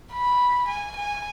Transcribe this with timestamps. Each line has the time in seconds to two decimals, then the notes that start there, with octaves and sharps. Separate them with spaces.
0.13 B5
0.68 G#5
0.97 G#5